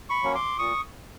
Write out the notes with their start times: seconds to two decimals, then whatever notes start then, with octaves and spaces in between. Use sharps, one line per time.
0.10 B5 C#6
0.23 F#3 A#3 C#4
0.35 C6 D6
0.59 A#2 C#6 D#6